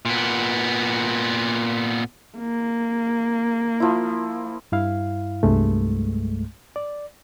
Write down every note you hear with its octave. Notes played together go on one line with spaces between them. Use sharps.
A#2 B3
A#3
F3 E4
G2 E4 F5
C2 G2 G#3 A3
D5